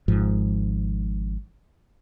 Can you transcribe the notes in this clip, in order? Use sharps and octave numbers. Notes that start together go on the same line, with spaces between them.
G#1 G#2 F3